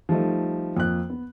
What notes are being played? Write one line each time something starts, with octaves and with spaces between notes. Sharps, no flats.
F3 G3 A3 D#4
F2 A#3 F#6
B3